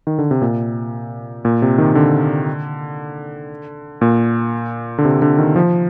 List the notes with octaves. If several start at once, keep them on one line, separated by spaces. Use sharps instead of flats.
D#3
D3
C3
A#2
A#2
C3
D#3
D3
A#2
D3
C3
D3
D#3
F3